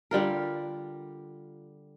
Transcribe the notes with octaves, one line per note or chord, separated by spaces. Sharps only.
D3 G3 F4 A#4